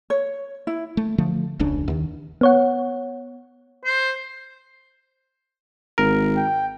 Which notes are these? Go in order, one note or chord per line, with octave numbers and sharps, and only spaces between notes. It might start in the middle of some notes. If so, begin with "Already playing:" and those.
C#5
E4
A3
D3 F3 A3
E1 C#2 C#3 D4
D#2 D#3
B3 C#5 F#5
C5
G#1 A#4
G5